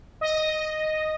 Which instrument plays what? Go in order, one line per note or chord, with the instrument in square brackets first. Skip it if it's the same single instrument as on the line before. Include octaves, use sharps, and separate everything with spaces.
[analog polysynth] D#5